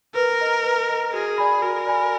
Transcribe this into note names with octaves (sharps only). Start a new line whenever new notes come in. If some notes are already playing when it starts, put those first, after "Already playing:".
A#4 B4
D#5 A#5
B4
D#5 A#5
F#4 G#4
D5 G#5 B5
F#4 A#4
D5 G#5 B5